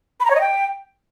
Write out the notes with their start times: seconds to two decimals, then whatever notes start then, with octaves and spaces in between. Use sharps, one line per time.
0.20 B5
0.25 A#5
0.30 C#5
0.36 D#5
0.41 G5